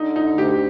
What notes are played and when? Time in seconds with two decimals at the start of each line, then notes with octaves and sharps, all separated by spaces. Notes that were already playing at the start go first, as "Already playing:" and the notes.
Already playing: D3 D#4
0.16 D#4
0.27 D2
0.38 G4